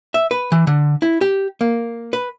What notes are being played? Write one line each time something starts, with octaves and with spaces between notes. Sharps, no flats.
E5
B4
E3
D3
E4
G4
A#3
B4